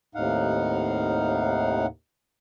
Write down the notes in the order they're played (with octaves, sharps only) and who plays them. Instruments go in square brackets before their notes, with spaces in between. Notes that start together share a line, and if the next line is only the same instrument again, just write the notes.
[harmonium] D#2 A2 C3 D#4 F5 F#5